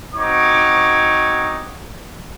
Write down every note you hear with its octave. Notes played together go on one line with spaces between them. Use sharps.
C4 D#4 F#4 C#5 D6